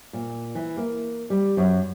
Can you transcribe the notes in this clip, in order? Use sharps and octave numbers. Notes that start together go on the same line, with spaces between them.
A#2
E3
A#3
G3
F#2